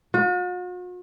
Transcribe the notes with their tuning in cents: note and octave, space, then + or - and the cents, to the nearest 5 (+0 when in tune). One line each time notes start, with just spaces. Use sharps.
F#4 -45